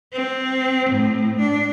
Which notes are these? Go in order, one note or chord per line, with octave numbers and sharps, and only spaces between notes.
C4
A2
D4